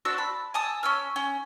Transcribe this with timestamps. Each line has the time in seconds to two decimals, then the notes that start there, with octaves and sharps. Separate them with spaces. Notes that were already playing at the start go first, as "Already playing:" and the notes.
0.05 C4 D4 F#4 E6
0.18 A5 B5
0.54 G#5 A5 D#6 E6
0.83 C#4 E6 F6
1.16 C#4